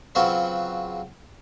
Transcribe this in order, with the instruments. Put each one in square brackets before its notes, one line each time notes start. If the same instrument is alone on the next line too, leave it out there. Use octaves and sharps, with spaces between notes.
[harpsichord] C#3 F#3 C4 F4 F#4 B4